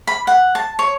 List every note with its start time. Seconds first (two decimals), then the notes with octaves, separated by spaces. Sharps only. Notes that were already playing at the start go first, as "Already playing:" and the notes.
0.07 B5
0.27 F#5
0.55 A5
0.79 C#5